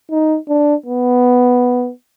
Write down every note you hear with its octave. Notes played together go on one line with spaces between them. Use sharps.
D#4
D4
B3